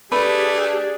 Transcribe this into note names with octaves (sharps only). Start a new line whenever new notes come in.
A3 D4 G4 G#4 B4